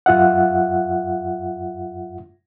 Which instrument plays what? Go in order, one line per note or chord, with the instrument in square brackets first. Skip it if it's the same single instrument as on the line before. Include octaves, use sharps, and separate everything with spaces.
[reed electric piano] F#2 F4 E5 F#5